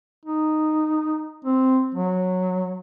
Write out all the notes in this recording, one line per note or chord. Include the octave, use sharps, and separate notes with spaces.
D#4
C4
F#3